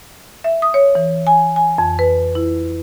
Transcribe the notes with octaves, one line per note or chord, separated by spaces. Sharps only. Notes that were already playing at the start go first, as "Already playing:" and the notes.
E5
D#6
C#5
E3
G#5
G#5
F2
B4
E4